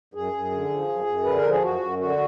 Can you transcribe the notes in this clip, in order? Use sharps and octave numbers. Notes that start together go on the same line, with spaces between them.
F#2 G#4
F#2
D3
F3
F#2
F#2
D3 B4
A#4
F3
G#4
F#2 F#4
F#2
D3 F#4